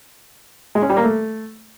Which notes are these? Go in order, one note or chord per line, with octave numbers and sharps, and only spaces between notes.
G#3
C#4
G3
A#3
A3